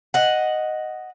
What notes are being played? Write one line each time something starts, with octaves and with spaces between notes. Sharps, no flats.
D#5 F#5